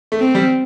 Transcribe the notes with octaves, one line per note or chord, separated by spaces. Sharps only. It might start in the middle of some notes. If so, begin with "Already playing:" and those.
A3
C4
G3